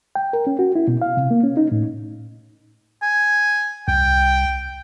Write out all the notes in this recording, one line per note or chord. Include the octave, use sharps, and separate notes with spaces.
G5
A#4
C#4
F#4
E4
B2
F5
C3
A#3
C#4
D#4
A2
G#5
C2 G5